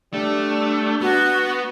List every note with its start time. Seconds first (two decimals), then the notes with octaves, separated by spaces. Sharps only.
0.13 G3 A3 D4
1.01 B3 F#4